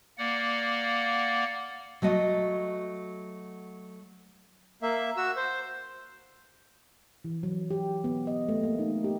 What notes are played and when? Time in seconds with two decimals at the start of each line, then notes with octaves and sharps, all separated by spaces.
0.18 A#3 D5 F#5
2.02 F#3 A3 F#4 D#5
4.82 A#3 E5
5.17 F#4 E6
5.36 C5
7.24 E3
7.43 F#3
7.71 G4
8.04 B3
8.27 D#5
8.49 A3
8.64 A#3
8.79 D#4
9.04 G4